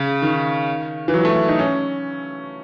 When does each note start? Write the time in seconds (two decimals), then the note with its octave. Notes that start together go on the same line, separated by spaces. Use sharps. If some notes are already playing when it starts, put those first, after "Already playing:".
Already playing: C#3
0.22 D#3
1.08 E3
1.14 F#3
1.25 A3
1.48 D#4
1.59 C#4